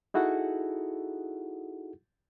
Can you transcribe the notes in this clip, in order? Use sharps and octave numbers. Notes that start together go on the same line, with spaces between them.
D#4 E4 F#4 G#4 A4 F#5